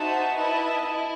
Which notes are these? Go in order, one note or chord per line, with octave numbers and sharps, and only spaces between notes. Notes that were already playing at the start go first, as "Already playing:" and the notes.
Already playing: D#4 F#4 C5 E5 A5
E4 B4 D#5 A5
E4